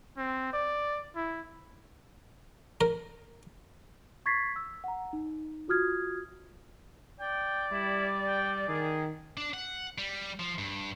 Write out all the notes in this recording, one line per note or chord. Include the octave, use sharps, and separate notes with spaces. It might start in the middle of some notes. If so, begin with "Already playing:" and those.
C4
D5
E4
A#4
C#6 G#6 A6 B6 C7
E6
F#5 A#5
D#4
F4 F#4 D#6 F6 G#6
D5 G5
G3 E4
G5
D#3 G#4
D4
F#5
G3
F3
G2